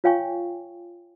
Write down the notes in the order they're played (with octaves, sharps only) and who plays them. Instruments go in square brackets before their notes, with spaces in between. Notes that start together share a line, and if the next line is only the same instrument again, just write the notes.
[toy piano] F4 C#5 F5 G5 G#5 C#6